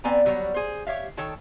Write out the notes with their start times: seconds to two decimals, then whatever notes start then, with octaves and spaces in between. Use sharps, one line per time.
0.04 B3 C4 D5 G#5 A#5
0.26 F#3 G3 B3 C#5
0.54 G#4 C5
0.87 G4 C#5 E5 F5
1.17 D#3 A4 C#5 G5 A5